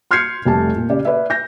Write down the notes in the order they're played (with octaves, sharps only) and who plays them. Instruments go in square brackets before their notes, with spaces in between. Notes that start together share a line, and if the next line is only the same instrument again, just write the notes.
[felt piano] C6 F6 G6 G#6 C7 C#7
F1 G3 A3 A5
A#2
C#3 G4 D5
B4 D5 E5
G6 A#6